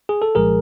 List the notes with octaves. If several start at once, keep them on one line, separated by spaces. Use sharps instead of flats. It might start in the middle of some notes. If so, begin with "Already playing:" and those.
G#4
A4
C2 A#2 F3 G#3 G#4 A#4